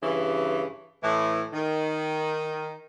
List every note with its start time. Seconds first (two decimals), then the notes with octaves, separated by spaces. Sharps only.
0.03 G2 C#3 E3
1.03 A2 E3
1.53 D#3